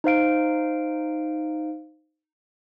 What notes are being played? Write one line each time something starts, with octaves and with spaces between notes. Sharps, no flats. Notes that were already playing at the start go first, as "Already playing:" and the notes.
D#4 C5 F5 D7